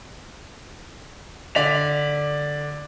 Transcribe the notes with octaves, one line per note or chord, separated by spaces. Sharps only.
D3 D5 B6 F7